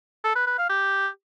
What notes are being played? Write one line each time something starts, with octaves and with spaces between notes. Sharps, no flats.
A4
B4
B4
F5
G4